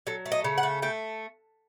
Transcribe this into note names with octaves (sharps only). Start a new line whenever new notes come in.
F#3 A4
A3
D#5
C#3
F#5
A3
A3 G5